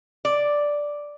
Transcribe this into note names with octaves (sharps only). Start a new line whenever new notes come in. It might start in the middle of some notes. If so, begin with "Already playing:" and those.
D5